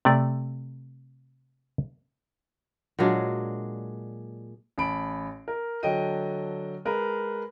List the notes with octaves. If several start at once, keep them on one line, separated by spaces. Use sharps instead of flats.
C3 A3 D5
A#2 F#3 G#3 D4
A1 A5 B5 D7
A#4
D3 F#3 A4 D#5 G5 D#7
G#3 G#4 A#4 B4